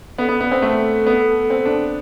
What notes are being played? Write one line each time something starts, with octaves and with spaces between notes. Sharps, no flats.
B3 A4
B3
B3
C4
A3 A4
B3
C4
D4